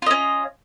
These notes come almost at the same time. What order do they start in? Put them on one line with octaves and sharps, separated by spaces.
F4 D#5 C#4